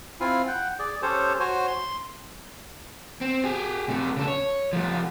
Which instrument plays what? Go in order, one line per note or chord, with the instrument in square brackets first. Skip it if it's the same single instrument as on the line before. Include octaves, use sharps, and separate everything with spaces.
[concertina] C4 E4 F4 F5 G#5
F#5 G5
G#4 D5
C#4 G4 A4 C5 C#5
F#4 C5 C#5 G#5
C6
[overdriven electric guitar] C4
G4 G#4
C3 A3
C#3 A4
C#5
F3 A3